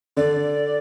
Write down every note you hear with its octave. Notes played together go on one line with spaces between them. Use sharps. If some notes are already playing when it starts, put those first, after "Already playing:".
D3 D5